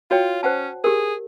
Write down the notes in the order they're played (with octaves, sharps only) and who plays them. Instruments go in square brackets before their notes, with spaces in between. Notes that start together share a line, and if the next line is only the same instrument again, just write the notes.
[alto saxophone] F4 [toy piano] F#4 C#5 G5
[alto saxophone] C#4 [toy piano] C5 F#5 A5
[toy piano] G4 A#4 [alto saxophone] G#4